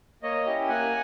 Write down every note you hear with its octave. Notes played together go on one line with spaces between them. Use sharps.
A#3 C#5 D#5
C#4 E4 G4
A#3 F#5 G#5